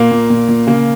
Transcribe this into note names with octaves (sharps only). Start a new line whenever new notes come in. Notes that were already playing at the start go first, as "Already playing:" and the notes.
Already playing: A#2 A#3
A#2
A#2
A#2
C#3 A#3